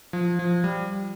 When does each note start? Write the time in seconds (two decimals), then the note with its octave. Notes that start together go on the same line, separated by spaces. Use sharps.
0.13 F3
0.39 F3
0.64 G3